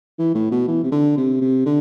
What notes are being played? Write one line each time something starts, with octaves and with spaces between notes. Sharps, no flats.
E3
A2
B2
E3
C3
D3
C3
C3
D3